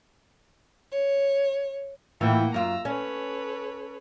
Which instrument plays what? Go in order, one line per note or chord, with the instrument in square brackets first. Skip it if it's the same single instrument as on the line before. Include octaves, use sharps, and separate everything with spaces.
[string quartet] C#5
[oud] A2 E3 F3 [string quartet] A#3 F#5 G5
[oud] F#2 F4 [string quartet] A#5 E6
[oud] C#4 [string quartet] A4 B4 C#5